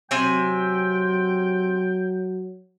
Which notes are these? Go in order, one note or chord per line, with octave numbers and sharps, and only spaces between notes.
C3 F#3 C4 G5 G#5